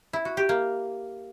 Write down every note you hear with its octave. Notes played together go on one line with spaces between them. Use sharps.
E4
F#4
G4
A#3